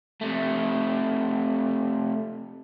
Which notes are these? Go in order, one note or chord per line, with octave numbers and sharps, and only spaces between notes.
C3 A3